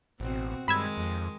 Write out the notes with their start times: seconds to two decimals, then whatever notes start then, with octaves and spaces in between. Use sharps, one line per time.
0.20 A1 B2 C4 F#4
0.68 G2 D#3 G#3 B5 E6 G#6
0.97 F2